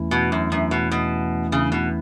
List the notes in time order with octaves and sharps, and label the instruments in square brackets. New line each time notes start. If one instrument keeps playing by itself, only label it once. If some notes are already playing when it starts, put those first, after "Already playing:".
Already playing: [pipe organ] E2 E3 A3 C#4 E4
[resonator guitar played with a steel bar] B2
F#2
F#2
B2
B2
C#3
B2